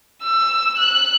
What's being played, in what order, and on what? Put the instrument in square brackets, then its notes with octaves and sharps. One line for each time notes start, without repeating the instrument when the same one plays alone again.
[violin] E6
F#6